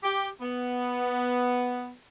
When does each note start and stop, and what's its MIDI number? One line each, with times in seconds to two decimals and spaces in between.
0.03 0.27 67
0.40 1.92 59